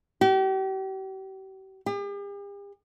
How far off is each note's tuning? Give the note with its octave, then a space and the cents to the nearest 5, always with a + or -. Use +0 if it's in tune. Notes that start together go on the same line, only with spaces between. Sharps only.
G4 -40
G4 +45